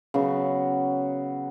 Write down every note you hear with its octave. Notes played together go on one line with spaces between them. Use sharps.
C#3 F#3 B3 F#4